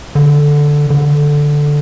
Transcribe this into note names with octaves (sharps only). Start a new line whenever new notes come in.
D3
D3